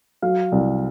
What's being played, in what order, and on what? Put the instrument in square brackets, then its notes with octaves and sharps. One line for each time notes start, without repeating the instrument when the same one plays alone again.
[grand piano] F#3 F5
C2